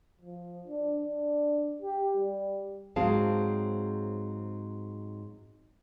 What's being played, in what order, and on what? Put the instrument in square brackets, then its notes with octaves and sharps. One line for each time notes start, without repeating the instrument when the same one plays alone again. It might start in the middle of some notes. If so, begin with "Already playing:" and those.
[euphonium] F3
D4
D4
G4
G3
[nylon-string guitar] G#2 F#3 C4 G#4 F5 A5